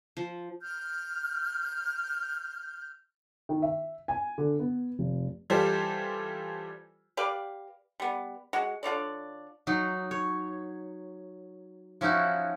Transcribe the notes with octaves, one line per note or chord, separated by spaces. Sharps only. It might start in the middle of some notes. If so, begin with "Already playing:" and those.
F3
F6 G6
D#3
E5
G#5
D3
B3
F1
E3 G3 F4 G4 A4 C5
G4 B4 D5 F5
G3 B3
G#3 F#4
D3 F4 C#5 D5
F#3 D#4
C#5
F3 C#4 D#4 E4 F#4